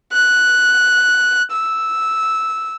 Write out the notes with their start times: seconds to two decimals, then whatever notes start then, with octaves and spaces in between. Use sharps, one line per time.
0.13 F#6
1.52 E6